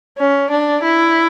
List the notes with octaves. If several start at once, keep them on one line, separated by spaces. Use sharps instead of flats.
C#4
D4
E4